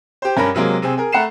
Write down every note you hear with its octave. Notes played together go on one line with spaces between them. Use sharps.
G4 C5
G2 C#4 A#4 B5 A#6
C3 F#3 G#3 A#3
C3 C4 G#4
G#4 A#4
A3 F#5 A#5 B5 C7 E7